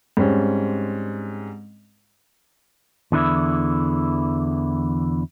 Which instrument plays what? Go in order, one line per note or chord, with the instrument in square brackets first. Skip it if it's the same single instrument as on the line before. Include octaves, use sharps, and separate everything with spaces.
[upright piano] G#2 G3 C4 C#4
[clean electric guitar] E2 D3 E3 E4